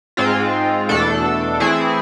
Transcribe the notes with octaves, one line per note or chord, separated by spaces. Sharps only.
G#2 G#3 C4 F4
E2 B2 A3 D4 A4
E3 A3 C4 E4 G#4